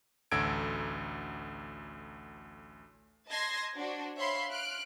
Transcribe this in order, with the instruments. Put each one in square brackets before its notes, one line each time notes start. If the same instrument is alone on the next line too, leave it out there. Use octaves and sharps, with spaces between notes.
[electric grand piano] A1 D2 A4 E6 G#6 D7
[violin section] D#5 A5 C6 G#6 A#6
D4 F#4 C5
C#5 E5 F5 B5 C6
F6 F#6 D7